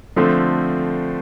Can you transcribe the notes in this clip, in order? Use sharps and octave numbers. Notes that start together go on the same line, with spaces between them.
D3 F3 A3 C4